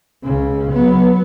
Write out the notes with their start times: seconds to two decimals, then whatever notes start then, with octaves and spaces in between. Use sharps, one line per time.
0.24 C#2 C#3
0.72 F#3 B3